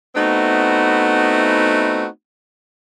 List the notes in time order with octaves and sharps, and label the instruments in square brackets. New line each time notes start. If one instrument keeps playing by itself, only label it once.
[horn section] A3 B3 C4 D#4 E4 F#4